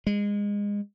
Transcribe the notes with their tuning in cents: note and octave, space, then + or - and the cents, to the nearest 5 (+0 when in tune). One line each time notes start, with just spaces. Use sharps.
G#3 -25